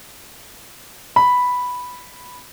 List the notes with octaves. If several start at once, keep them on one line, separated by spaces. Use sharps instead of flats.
B5